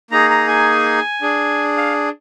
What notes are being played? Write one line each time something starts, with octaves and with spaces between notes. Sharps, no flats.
A#3 D#4 G#4 A#5
A#5
G#5
D4 G#4
F5